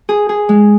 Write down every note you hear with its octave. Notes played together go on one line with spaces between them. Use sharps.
G#4
G#4
G#3